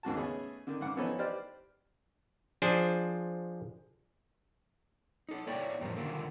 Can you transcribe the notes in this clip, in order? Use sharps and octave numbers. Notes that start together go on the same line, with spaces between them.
D#2 G#2 F#4 A5
A3 B3 C#4 G#4
D3 D#3
G#2 C#3 F#5 D6
E3 F3 B3 D#4 A4 C#5
G4 B4 C5 D5 F6
F3 D4 G#4 C5
D#4 A4
A#3 E4 C#5 D5 E5 G5
F2 A2 E3 G3 A#3 C4
D3 D#3 A#3 F4 A4 A#4